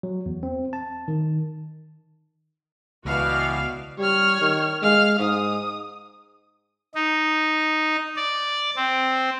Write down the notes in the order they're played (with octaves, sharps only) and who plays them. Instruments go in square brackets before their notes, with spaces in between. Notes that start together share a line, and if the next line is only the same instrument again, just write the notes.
[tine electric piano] F#3
E2
C4
A5
D#3
[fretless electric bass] C#2 [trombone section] B2 E3 [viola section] F#4 D5 F5
[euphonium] G3 [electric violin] C#5 F6
[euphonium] D#3
[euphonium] G#3 [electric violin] F5 F6
[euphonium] G#2 [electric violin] D#6
[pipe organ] D#4
D5
C4